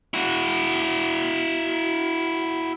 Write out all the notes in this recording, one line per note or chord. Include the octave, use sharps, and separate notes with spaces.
E4 F#4